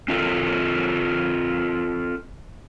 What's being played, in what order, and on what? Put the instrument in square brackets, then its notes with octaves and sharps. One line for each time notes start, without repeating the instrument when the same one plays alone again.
[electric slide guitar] C4 F4 G4 A4 A#4